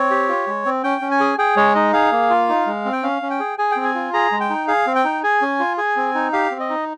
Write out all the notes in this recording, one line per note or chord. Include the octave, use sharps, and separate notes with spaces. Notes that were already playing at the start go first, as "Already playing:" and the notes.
Already playing: C4 C#5
G4
F4
G#3
C4
C#4 G5
C#4
G#5
G#4
G#4 G5
G#3 C#5
D#4 D#5
G#4 F5
A#3
F4
D#4
G#3
C4
G5
C#4 F5
C#4
G5
G#4
G#4 G#5
G5
C4
G#5
F4
G#4 A#5
G#3
G5
D#4
G#4 F5
C4
G5
D#4
G#4 G#5
C#4
F4
G#4 G#5
C4
D#4
G4 F5
C4
D#5
D#4